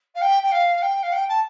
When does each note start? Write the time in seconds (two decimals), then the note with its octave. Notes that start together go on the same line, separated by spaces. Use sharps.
0.15 F5
0.21 G5
0.42 G5
0.51 F5
0.82 G5
1.02 F5
1.12 G5
1.28 A5